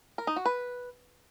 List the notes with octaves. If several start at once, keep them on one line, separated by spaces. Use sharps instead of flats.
A#4
D#4
F#4
B4